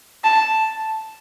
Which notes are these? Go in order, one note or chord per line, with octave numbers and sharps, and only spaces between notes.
A5